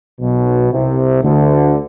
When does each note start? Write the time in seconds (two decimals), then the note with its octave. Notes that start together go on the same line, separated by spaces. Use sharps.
0.21 B1 B2
0.72 C2 C3
1.22 D2 D3